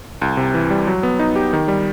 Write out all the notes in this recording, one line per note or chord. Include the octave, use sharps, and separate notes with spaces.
C2
C3
E3
G3
F#3
B3
D#4
G4
D#3
G3